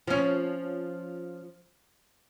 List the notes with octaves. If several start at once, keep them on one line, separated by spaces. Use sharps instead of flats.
F3 C#4